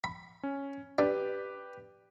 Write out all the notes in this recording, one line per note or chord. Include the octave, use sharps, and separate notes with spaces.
B5
C#4
D4 G4 B4